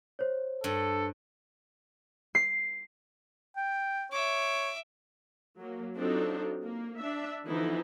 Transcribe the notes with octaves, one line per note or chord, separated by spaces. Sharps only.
C5 C#5
G2 A4
C7
G5
C#5 E5 D6
F#3 A#3
F#3 C4 D4 D#4 F4 A4
A#3
D4 E5
D3 E3 F3 B3 D#4 E4